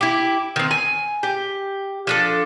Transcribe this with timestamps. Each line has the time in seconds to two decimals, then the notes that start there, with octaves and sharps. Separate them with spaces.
0.01 E4 G4
0.56 D#3 C4
0.71 G#5
1.23 G4
2.07 F3 D4 A4